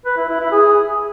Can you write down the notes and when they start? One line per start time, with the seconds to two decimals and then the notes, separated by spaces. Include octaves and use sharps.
0.06 B4
0.17 E4
0.29 E4
0.40 E4
0.52 G#4